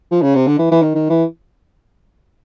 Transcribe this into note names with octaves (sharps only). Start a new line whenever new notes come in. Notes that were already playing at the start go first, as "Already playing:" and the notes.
F3
C#3
C3
D3
E3
E3
D#3
D#3
E3